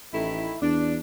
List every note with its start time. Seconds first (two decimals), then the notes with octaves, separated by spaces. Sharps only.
0.13 A1 D#3 A3 E4
0.61 E2 D4